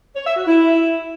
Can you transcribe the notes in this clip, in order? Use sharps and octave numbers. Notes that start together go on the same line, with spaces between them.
C#5
E5
F#4
E4